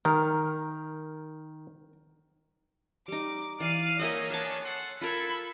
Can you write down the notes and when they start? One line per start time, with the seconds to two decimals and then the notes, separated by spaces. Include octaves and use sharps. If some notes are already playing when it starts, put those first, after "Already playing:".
0.05 D#3 A#4
3.08 G3 D#4 D6
3.60 E3 D5 F5 D#7
3.99 A#3 D#4 G#4 C#5 D#5 E5 F#5
4.30 B3 C#4 D4 F5 G#5 A5
4.64 A4 F#5 C6
5.01 F4 A4 A#4 B5 G#6